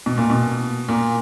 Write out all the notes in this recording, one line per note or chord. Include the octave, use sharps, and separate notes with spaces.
B2
A#2
B2
A#2